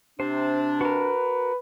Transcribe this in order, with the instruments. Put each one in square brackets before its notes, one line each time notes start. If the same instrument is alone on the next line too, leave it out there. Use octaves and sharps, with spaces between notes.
[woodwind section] C3 D4 [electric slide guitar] C5
[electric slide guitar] F#4 A#4 [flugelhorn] B4